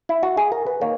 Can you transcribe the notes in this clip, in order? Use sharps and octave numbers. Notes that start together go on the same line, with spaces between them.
E4
F#4
G#4
A#4
B4
D#3 A#3 C#5